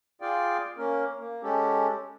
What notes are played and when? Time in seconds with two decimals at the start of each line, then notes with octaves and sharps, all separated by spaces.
0.21 F4 G#4 D5 F5 G5
0.77 A#3 C#4 A#4
1.18 A#3
1.43 G#3 C#4 G4 A4